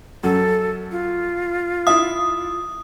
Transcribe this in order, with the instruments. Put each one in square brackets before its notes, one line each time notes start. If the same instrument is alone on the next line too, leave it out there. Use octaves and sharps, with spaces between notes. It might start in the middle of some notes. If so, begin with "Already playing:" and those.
[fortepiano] F#2 [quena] A4
[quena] F4
[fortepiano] E4 E5 [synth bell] D#6